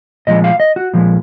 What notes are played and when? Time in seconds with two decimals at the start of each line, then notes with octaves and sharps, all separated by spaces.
0.27 A#2 F3 G#3 D#5
0.44 F5
0.60 D#5
0.76 F#4
0.94 A#2 F3 G#3